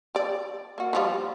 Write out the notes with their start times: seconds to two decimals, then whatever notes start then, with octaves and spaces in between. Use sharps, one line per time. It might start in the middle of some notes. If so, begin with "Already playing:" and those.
0.15 G4 D5
0.78 A#3 F#4
0.93 E3 F3 G3